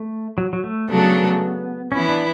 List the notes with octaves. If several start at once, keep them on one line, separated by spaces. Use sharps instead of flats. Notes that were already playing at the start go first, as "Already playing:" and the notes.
Already playing: A3
F#3
F#3
A3
C#3 F#3 A3 B3 D4 A4
E3 B3 C#4 E4
D4